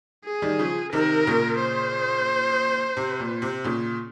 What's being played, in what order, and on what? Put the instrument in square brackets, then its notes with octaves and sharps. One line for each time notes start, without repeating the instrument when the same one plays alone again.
[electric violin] G#4
[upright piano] D#3 G3
C#3 F3
[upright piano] C3 D#3 [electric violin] A#4
[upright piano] A#2 C#3
[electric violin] C5
[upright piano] C3
A#2
C3
A#2 C#3